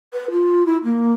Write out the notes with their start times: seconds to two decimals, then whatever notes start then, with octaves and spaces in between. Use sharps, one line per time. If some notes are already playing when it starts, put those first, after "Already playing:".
0.13 B4
0.30 F4
0.65 E4
0.83 A#3